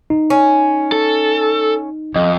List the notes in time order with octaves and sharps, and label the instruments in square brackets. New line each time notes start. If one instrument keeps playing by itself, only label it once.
[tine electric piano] D#4
[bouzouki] C#4
[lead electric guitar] A4
[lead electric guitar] F2 [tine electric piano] D#5